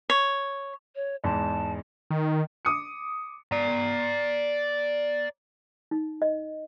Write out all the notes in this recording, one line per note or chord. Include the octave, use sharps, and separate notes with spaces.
C#5
C#5
E2 G#2 A5
D#3
D6 D#6 C#7
D5 A#5
D#4
D#5